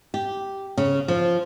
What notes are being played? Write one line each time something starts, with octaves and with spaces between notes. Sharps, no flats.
G4
C#3
F3